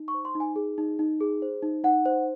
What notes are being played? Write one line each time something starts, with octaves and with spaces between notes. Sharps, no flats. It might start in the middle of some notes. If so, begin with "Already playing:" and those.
Already playing: D#4
C#6
C5
C6
D#4
G#5
G#4
D#4
D#4
G#4
C5
D#4
D#4 F#5
C5